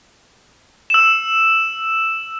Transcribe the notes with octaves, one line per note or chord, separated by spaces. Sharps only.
E6 E7